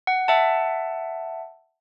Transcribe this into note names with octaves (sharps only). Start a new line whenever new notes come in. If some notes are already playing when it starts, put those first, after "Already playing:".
F#5
E5 F#5 A5